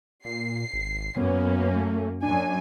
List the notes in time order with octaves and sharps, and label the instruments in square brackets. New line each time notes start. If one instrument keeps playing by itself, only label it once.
[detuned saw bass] A#2 [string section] C7
[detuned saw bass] G#1
[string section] F#2 A#3 C#4 [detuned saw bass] B3
[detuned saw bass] A3
[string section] F#2 G#5 [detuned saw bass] D4